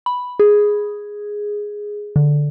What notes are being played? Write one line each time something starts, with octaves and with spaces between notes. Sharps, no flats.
B5
G#4
D3